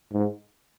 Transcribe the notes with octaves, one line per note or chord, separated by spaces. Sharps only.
G#2